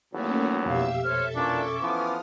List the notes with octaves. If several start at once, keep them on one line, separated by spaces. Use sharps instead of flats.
G#1 E2 F#3 A3 A#3 C#4
F2 B2 G4 E5 F5 E6
A4 C5 C#5 E5 F6
A#2 E3 C#4 D4 D6
E3 F3 B3 D#6 F6